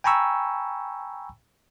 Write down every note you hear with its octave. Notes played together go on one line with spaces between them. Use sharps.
G5 G#5 A#5 B5 C#6 E6